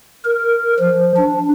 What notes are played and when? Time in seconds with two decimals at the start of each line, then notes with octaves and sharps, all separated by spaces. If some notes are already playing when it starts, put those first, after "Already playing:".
0.24 A#4
0.79 F3
1.17 D4